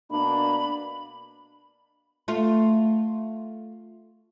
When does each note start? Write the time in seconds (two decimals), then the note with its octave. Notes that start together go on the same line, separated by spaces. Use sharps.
0.11 B2 A#3 D4 B5
2.28 A3 F4